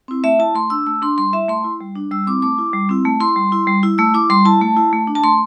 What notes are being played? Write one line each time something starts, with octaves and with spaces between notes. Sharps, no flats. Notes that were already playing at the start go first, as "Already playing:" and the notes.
C4 E4
A3 E5
E4 A5
A3 C6
D4 E6
A3 E6
D4 C6
G3 C6
E4 E5
A3 C6
E4
G3
D4
G3 E6
C4 E4 D6
A3 D6
E4
G3
C4 E4
A3
E4 C6
G3
E4
G3
E4
A3 E6
E4 D6
G3 C6
E4 A5
A3
E4
A3
D4
A5
A3 C6